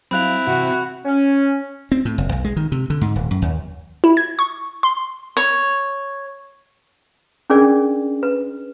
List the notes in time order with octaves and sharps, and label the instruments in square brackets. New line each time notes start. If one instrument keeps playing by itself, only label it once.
[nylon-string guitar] F#3 F5 [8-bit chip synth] C4 E4 [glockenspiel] B5 F#6 F7
[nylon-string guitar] C3 E3 [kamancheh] F#4
[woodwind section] C#4
[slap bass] C4
A2
F#1
B1
G#3
D#3
C3
D3
G#2
D#1
F#2
D#2
[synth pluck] E4
G#6
C#6
C6
[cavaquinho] C#5
[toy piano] C#4 D4 G#4 A#4 D5
B4